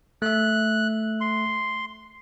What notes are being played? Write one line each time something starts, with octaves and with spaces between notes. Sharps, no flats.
A3 E5 F#6
C6